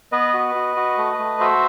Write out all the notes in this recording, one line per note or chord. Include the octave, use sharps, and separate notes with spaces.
B3 B4 D#5
F#4
F#4
F#4
A3
A3
F#4 C5 E5